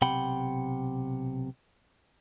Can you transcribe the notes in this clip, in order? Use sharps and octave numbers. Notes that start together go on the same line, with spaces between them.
B1 C3 F#5 G5 B5